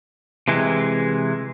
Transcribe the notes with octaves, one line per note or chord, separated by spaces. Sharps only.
C3 E3 G#3